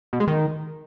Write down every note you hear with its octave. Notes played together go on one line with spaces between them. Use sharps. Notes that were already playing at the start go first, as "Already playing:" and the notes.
B2
G#3
D#3